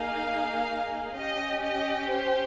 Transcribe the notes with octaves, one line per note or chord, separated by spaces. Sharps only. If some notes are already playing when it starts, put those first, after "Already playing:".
Already playing: A#3 D#4 G#4 F5
C#4 G4 D#5
D#5
C5